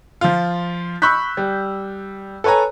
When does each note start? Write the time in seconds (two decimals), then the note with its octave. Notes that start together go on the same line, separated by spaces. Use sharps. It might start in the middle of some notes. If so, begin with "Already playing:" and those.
0.21 F3 F4
1.02 B5 C#6 E6 F#6 G6 B6
1.37 G3
2.44 A4 B4 C#5 G#5 A#5